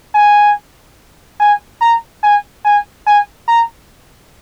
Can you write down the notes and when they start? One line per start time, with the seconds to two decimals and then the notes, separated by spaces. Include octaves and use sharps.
0.15 G#5
1.40 G#5
1.81 A#5
2.23 G#5
2.65 G#5
3.07 G#5
3.48 A#5